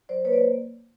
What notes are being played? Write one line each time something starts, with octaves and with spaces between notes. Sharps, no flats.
F#3 C5 D5
A#3 B4 C#5
C5 D5